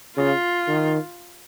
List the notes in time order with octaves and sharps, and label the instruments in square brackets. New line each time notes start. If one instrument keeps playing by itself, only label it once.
[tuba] C#3 [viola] F4
[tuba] D#3